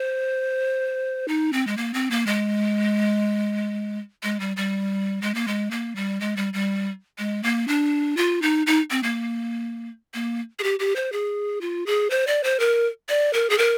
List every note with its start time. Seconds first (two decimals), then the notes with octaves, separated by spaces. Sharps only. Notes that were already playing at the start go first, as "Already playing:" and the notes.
Already playing: C5
1.28 D#4
1.53 C4
1.67 G#3
1.77 A#3
1.94 C4
2.11 A#3
2.27 G#3
4.23 G#3
4.40 G3
4.57 G3
5.22 G#3
5.35 A#3
5.48 G#3
5.71 A#3
5.96 G3
6.21 G#3
6.37 G3
6.54 G3
7.18 G#3
7.43 A#3
7.68 D4
8.17 F4
8.42 D#4
8.67 D#4
8.91 C4
9.03 A#3
10.14 A#3
10.59 G#4
10.63 G4
10.79 G4
10.96 C5
11.12 G#4
11.61 F4
11.86 G#4
12.10 C5
12.27 D5
12.44 C5
12.60 A#4
13.09 D5
13.33 A#4
13.50 G#4
13.58 A#4